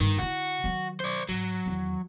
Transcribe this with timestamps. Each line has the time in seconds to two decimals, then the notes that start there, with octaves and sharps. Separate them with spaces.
0.01 G2 D#3
0.19 D3 E4 F#4
0.64 D#3 F#3
1.00 C5 D5
1.29 G#2 F#3
1.66 E2 D#3